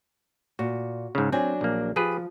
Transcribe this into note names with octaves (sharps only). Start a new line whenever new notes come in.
A#2 F#4
G#2 C#3
F#3 C4 D4 G#5
A#1 A#3
F3 G4 G#4 B4